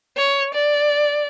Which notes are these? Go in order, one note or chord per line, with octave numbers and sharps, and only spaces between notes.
C#5
D5